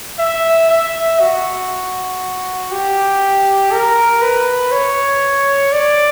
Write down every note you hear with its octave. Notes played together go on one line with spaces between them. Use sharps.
E5
E5
F#4
G4
A#4
B4
C#5
D5